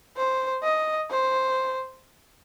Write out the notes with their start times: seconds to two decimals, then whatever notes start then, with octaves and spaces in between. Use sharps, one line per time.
0.17 C5
0.63 D#5
1.11 C5